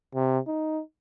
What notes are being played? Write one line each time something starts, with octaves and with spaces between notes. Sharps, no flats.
C3
D#4